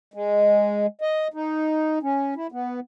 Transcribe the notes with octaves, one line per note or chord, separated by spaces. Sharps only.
G#3
D#5
D#4
C#4
E4
B3